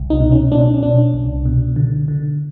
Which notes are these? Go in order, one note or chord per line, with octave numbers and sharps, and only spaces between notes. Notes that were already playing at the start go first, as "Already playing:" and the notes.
Already playing: C2
D#4
B2
C#4
B2 D4
C#4
B2 D4
C2
B2
D3
D3